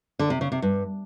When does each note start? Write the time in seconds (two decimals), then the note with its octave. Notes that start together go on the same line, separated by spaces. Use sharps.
0.19 D3
0.30 C3
0.41 C#3
0.52 C3
0.62 G2